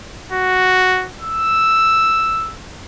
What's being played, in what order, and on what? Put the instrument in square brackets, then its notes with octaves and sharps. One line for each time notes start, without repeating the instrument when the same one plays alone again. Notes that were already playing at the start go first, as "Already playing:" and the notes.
[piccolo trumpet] F#4
E6